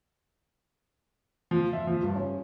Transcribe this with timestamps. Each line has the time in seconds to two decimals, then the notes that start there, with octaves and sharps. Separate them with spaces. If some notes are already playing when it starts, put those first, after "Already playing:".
1.51 F3
1.73 E5
1.87 F3
2.03 G2
2.16 C#4